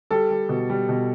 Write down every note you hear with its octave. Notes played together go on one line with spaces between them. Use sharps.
G3 A4
G3
B2
G3
B2